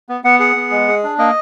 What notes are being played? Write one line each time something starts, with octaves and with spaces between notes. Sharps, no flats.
B3
B3 F#5
G#4 F#5
B3
G#3
G#4
D4
A#3 D#5